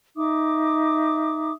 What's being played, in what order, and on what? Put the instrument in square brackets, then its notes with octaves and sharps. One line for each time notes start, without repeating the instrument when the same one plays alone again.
[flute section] D#4 E5 D6 D#6